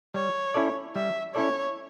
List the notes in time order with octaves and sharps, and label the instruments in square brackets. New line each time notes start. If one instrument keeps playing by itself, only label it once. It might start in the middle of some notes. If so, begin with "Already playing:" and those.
[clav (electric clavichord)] G3 [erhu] C#5
[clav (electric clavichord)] C#4 E4 A4 D5
[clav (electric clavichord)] G3 [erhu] E5
[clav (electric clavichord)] C#4 E4 A4 D5 [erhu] C#5